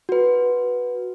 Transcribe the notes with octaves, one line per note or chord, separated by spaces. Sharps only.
F#4 B4